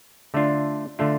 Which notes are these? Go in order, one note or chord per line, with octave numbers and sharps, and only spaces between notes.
D3 A3 D4 F4
D3 A3 D4 F4